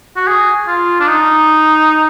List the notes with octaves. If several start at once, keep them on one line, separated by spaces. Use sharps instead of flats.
F#4
G#4
F4
D4
D#4